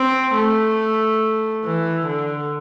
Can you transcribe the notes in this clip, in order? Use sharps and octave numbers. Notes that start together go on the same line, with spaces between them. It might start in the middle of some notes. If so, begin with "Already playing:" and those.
Already playing: C4
A3
E3
D3